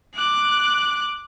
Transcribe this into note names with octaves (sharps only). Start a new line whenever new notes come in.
D6 F#6